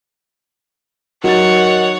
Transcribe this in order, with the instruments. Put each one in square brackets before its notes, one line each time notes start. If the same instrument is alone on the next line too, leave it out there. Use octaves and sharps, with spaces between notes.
[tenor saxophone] D#3 [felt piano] F#3 A6 [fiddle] C#5 [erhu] F#5